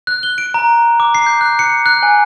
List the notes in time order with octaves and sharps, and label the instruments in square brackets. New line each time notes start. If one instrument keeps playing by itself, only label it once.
[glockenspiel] F#6
G7
D7
A#5
D6
C7
G6
F#6
C#7
F#6
G#5